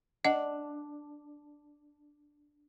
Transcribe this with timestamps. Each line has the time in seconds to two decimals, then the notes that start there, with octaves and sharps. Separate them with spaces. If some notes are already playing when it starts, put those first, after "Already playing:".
0.25 D4 D#5 F#5